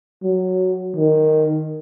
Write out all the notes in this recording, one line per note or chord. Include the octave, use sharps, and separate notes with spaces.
F#3
D#3